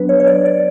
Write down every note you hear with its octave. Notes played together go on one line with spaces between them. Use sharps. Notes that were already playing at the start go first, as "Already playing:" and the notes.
Already playing: F#3 B3 D4 B4
C#5
C#5
D5
D5